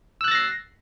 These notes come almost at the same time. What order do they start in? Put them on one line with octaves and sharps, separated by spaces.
E6 F#6 A6 A#6 C7